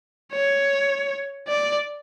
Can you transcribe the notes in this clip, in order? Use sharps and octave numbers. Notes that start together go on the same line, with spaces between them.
C#5
D5